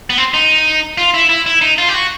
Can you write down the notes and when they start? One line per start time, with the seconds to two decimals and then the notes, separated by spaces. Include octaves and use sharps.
0.10 B3
0.18 C4
0.34 D#4
0.98 F4
1.14 E4
1.29 E4
1.46 E4
1.61 D#4
1.78 F4
1.89 G4
1.94 F#4